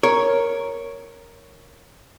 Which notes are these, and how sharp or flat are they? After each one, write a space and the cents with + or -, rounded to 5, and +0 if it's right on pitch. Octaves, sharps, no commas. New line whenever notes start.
A#4 +0 C#5 +0